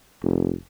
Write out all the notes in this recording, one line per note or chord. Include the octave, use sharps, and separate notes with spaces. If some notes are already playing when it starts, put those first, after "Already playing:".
F1